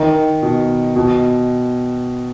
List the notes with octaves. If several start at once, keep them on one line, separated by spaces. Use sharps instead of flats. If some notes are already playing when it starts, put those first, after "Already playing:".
Already playing: D#3
B2
B2